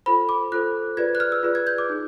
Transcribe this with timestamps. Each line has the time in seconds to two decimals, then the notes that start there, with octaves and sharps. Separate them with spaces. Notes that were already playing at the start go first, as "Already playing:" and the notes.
0.06 F4 A4 C5 B5
0.29 D6
0.52 F4 A4 C5 F#6
0.97 F4 G#4 B4 D5 G#6
1.15 F#6
1.20 F6
1.32 E6
1.43 F4 G#4 B4 D5
1.55 G#6
1.67 G6
1.78 D6
1.89 D#4 G#4